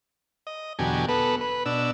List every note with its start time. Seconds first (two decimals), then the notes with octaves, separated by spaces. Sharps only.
0.47 D#5
0.79 E2 B2 D3 F#3 G4 G#5
1.09 B3 A4 B4
1.41 B4
1.66 B2 D4 E6